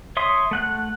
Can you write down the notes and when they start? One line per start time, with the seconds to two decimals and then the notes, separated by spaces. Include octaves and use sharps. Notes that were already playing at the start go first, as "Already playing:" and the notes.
0.17 C#5 E5 C6 D#6
0.51 A3 F#5 F#6